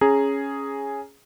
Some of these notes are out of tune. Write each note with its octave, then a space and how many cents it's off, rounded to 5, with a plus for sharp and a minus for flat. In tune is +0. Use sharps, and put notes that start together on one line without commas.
C#4 +0 G#4 +0 A#5 +0